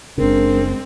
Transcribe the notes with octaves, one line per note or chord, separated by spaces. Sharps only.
F#1 C#3 G#3 C4 D4 A#4